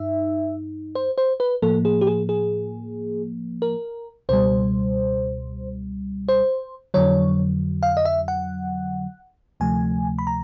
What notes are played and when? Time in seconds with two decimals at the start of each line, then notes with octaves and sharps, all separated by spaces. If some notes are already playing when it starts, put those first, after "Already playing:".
Already playing: G2 D#4 E5
0.95 C5
1.18 C5
1.40 B4
1.62 A2 F3 A#3 A4
1.85 G#4
2.01 G4
2.07 G#4
2.29 G#4
3.62 A#4
4.29 C#2 B2 G3 C5
6.29 C5
6.94 F2 D3 F#3 C#5
7.83 F5
7.97 D#5
8.05 E5
8.28 F#5
9.60 D2 C3 F3 A3 G#5
10.19 B5
10.27 A#5